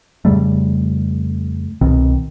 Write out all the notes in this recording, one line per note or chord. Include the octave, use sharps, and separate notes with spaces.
F2 C#3 G3 A3
C2 B2 D#3 C4